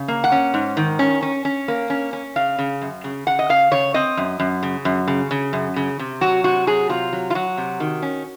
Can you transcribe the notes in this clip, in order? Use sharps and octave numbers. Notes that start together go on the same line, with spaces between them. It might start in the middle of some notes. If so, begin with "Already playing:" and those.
Already playing: C#3
A#3
F#5
C#4
G#2
D#3
C#4
C#4
C#4
A#3
C#4
C#4
C#3 F5
C#3
F#2
C#3
C#3 F#5
D#5
C#3 F5
C#3 C#5
C4 D#5
F#2
F#2
C#3
F#2
C#3
C#3
F#2
C#3
C3
F#3 F#4
C3 F#4
F#3 G#4
C3 F4
F#3
F4
F#3 F#4
C3
D#3
C#4